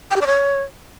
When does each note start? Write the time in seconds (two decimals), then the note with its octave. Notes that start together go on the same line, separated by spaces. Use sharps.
0.11 G5
0.16 G4
0.21 D5
0.26 C#5